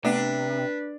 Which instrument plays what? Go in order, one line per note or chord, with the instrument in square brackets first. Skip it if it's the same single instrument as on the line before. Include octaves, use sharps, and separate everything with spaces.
[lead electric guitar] C3 [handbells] A3 B3 [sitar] D4 [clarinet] B4